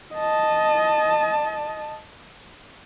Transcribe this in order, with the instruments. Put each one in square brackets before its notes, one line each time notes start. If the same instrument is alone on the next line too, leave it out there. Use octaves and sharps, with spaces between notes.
[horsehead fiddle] D#5 A5